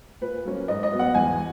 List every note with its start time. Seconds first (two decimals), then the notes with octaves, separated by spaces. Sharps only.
0.21 A#2 B4
0.45 F#3 A#3 C#4
0.68 G#2 D#5
0.83 D#5
0.92 F#3 B3
0.99 F#5
1.15 E2 G#5